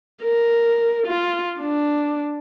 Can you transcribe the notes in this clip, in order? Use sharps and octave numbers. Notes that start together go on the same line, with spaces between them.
A#4
F4
D4